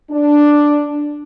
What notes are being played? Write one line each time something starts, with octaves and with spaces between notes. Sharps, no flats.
D4